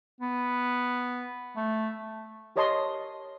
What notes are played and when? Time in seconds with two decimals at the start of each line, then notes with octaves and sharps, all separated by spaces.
0.21 B3
1.56 A3
2.56 G4 A#4 C#5 D#5 A5 C6